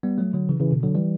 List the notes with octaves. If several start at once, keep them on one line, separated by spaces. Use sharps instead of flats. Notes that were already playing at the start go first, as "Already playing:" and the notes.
G3 B3
F#3 A3
D3 F#3
C#3 E3
C#3 E3
B2 D3
D3 F#3
E3 G3